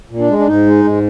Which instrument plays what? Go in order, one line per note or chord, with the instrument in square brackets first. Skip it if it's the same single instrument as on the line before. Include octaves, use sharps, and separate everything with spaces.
[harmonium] A#2
D4
G#3
D4
G#2 D#4
G#3
G#2